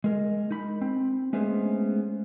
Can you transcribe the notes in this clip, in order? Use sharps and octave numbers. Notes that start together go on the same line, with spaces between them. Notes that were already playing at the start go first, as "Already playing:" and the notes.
G#3 A#4
D#4 B5
C4
G#3 A3 B3 C#4 G#4 C5